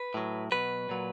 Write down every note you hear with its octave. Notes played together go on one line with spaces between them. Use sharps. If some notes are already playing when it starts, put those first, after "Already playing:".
Already playing: B4
A2 F#3
B2 F#3 B4
A#2 F#3